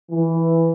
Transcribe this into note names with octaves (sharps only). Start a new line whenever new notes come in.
E3